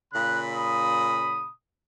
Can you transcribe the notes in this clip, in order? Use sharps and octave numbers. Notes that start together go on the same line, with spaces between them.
A#2 C#3 B5 F#6
D#6